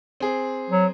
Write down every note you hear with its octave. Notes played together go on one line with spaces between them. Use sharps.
C4 G#4
F#3